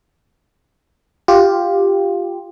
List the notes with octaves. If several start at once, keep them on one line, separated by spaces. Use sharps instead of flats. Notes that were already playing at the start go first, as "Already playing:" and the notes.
F4 G4